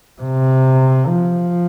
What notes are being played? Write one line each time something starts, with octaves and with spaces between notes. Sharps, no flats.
C3
F3